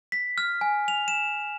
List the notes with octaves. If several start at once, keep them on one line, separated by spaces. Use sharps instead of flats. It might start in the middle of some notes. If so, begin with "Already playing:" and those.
B6
F6
G#5
F7
E7